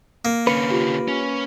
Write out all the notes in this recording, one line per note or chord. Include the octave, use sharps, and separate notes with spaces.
A#3
D3 C#4 B4 C#7
F4 G4
C#4